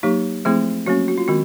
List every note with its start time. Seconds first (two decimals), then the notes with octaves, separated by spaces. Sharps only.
0.03 F#3 A#3 D#4 G4
0.45 F3 A3 C4 E4 G#4
0.86 F#3 A#3 C#4 F#4
1.08 F#4
1.18 F4
1.28 D#3 G#3 C4 F#4